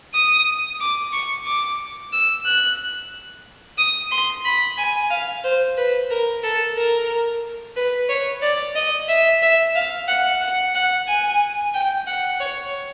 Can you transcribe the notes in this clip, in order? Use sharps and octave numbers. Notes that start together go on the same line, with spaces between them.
D#6
D6
C#6
D6
E6
F#6
D#6
C6
B5
G#5
F5
C5
B4
A#4
A4
A#4
B4
C#5
D5
D#5
E5
E5
F5
F#5
F#5
F#5
G#5
G5
F#5
C#5